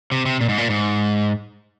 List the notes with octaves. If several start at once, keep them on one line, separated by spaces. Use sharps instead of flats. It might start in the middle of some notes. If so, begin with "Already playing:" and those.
C3
C3
A#2
G#2
A#2
G#2